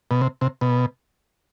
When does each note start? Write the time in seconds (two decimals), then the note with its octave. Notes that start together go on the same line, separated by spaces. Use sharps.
0.11 B2
0.21 C3
0.41 C3
0.61 B2